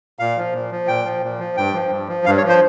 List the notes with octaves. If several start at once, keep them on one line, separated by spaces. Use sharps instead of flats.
A#2 F5
F3
A#2
F3
A#2 G5
F3
A#2
F3
G2 G5
F3
G2
F3
G2 F5
C#5
F3
C5